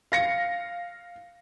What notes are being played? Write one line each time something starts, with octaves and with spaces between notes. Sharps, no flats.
F5 A#6 C#7